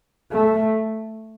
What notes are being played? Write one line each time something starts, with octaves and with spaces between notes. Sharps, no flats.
A3